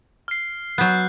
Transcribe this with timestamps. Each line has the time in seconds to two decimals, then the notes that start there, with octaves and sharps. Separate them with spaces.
0.28 F6 C7
0.78 F#3 B3 F#6 G6